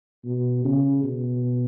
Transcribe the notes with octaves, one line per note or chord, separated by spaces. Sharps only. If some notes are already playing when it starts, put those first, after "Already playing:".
B2
C#3
B2